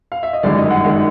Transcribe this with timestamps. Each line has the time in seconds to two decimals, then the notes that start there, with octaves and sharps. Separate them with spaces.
0.12 F5
0.23 E5
0.33 D#5
0.43 G1 F#2 D#3 G#3 D5
0.58 D#5
0.71 F#5
0.84 D#3 G#3